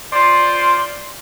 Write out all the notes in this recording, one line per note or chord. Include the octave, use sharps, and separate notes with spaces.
F4 C5 D5